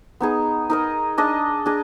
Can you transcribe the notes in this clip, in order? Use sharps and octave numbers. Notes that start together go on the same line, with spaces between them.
B3 D#4 G#4
D#4 A#4 D#5
D4 G#4 D#5
D4 G#4 D#5